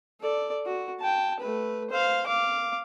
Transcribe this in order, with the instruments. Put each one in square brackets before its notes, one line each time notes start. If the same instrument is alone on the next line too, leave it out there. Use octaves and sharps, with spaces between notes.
[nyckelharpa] A4 D5
F#4
G5 A5
A3 B4
C5 F5
F5 D6